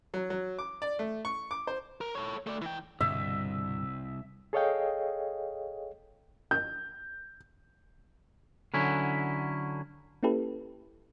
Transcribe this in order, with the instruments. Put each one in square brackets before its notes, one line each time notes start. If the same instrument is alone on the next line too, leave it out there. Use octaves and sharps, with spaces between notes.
[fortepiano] F#3
F#3
D6
D5
A3
C#6
D6
C5
[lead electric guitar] A#4
A4 C#5
A3 D5
E3 G5
[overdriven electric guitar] C2 [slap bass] G2 B2 D3 [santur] E5
[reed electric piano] G#4 A4 C#5 D#5 F5 G5
[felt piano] G6
[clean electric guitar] D3 F#3 C#4 E4
[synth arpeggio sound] A#3 C#4 E4 G4 A4 B4